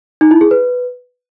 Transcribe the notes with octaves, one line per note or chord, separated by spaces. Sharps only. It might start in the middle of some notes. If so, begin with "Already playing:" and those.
D#4
E4
G#4
B4